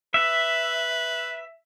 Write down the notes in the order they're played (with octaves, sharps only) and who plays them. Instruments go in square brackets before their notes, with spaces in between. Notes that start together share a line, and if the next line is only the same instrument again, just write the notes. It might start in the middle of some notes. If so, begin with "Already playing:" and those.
[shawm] B4 [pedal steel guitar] E5